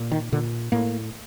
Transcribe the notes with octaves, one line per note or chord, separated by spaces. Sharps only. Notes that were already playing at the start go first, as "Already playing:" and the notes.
Already playing: A#2
D#3
A#2 D3
A2 A#3